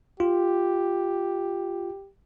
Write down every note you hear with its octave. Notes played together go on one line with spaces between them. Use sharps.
F4 G4